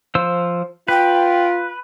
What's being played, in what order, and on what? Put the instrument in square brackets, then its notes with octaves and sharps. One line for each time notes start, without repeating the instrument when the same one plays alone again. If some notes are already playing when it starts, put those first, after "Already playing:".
[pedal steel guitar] F3 C5 E6
[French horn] F4 [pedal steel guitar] B4 [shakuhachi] G5